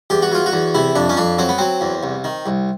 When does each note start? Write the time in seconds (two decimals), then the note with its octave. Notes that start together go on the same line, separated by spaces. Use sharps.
0.10 E2 G4
0.22 F#4
0.32 F#3 F4
0.46 F#4
0.53 E2
0.75 C3 E4
0.95 F2 D4
1.09 C#4
1.17 F2 D4
1.38 F#3 C4
1.49 B3
1.58 F#3 C4
1.81 E2
2.03 C2
2.24 D#3
2.46 C2